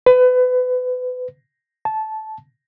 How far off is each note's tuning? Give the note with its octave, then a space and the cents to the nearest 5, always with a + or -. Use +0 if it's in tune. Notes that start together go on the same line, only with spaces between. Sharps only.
B4 +30
A5 -15